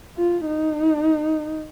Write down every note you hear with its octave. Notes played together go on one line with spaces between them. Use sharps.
F4
D#4